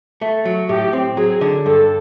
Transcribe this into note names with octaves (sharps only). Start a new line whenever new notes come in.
A3
F#3
A2 G4
C4
F#3 G#4
D3
G2 A4